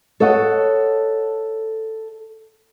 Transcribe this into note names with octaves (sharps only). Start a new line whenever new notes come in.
A4 C#5 D#5 F#5